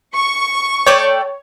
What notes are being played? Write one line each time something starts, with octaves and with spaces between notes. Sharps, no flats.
C#6
A3 C#5 D5 G5